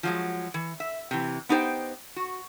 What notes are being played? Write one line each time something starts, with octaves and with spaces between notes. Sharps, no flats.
F3 F#3 G#3
E3
E5
C3 E3
B3 D#4 G4 A4 C5 G5
F#4